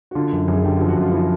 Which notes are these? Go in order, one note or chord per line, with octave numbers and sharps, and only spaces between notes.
F#4
D3 F4
F#2
F#2 G#4
D3 G4
F#4
F3
F#4
F#2 F4
F4
F3 E4